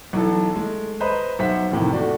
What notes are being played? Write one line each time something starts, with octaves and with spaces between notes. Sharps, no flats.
B1 E3 A4
G#3 A3
B4 C5 D#5 A#5 B5
B1 C5 E5 F#5 B6
F2 A2 C3 D#3
A3 F#4 D5